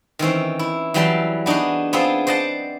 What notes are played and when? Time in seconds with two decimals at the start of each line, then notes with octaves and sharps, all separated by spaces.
0.19 D#3 E3 C4 C#4
0.59 E4
0.94 E3 F#3 G3 G5 A5 C6
1.46 B3 D4 D#4 F#4 G#4
1.93 B3 C4 F4 G#4 A5
2.27 C5 D5 D#5 F#5 A5